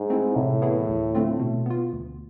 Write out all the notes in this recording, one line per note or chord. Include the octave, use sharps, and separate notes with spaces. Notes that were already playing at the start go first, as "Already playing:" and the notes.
Already playing: G#2
A3 C4 E4
A2 C3
E3 B3 E4 G#4
D2
D3 A3 C4 F4
B2
B3 F4
D2